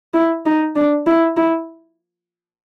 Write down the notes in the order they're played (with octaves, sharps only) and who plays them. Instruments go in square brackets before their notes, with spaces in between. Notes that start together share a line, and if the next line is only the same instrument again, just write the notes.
[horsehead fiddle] E4
D#4
D4
E4
E4